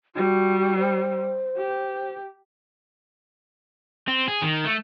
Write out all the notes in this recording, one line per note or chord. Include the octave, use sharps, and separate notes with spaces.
G3 F#4
C5
G4
C4
G#4
D#3
A3